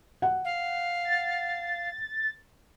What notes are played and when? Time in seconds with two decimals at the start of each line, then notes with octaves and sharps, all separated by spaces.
0.22 F#5
0.45 F5
1.05 A6